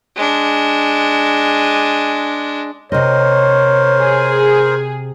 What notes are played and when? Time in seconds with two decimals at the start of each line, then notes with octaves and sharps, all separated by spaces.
0.16 G#3 D4
2.92 C3 A#4 C5 C#5 D#5
3.98 G#4